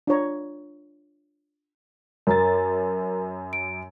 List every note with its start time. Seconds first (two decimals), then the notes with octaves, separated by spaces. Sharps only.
0.07 D4 F4 C#5 A#5
2.27 F#2 A#4 A#5 A6
3.53 D7